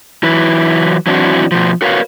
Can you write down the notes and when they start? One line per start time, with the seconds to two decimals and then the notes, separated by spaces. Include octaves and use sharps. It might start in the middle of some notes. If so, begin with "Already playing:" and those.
0.23 E3 F#3 E4 B4
1.07 E3 F#3 C4 D4 E4 F#4
1.52 B2 F3
1.82 F#4 A#4 B4 C#5 F5